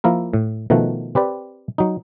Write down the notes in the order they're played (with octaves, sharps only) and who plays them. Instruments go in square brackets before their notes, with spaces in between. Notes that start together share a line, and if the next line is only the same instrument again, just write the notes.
[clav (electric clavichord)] F3 A#3 E4 A#4
A2
B2 D#3 F3 A3 F#5
C4 G4 B4 D5
F#3 D#4